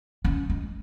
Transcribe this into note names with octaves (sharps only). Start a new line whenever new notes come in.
C#4
G#3